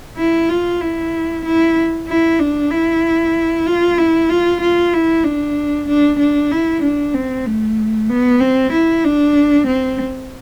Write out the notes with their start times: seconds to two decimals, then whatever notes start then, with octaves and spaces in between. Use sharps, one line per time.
0.17 E4
0.49 F4
0.81 E4
1.45 E4
2.08 E4
2.39 D4
2.71 E4
3.66 F4
3.97 E4
4.29 F4
4.61 F4
4.93 E4
5.24 D4
5.88 D4
6.19 D4
6.51 E4
6.83 D4
7.14 C4
7.45 A3
8.09 B3
8.40 C4
8.72 E4
9.05 D4
9.67 C4